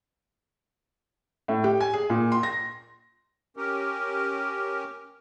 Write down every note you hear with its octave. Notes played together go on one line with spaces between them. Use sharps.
A2
G4
G#5
G#4
A#2
C6
A#6
C#4 G4 A#4